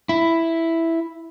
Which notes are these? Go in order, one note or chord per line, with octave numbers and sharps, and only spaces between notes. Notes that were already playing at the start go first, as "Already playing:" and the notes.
E4